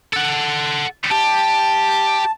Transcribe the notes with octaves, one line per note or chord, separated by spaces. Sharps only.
A4 F#5
G4 A5